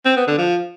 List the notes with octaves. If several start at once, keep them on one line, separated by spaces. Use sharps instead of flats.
C4
B3
D3
F3